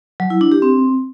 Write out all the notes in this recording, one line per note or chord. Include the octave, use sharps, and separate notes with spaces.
F#3
E4
D4
G4
C4